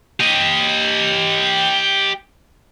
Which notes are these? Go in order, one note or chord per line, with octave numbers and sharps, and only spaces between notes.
G4 D#5